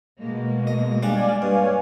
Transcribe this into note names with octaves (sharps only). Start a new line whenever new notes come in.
B2 G#3 A#3
D#5
G3 D4 D5 F5 G#5 D6
G2 C#5 F5 G#5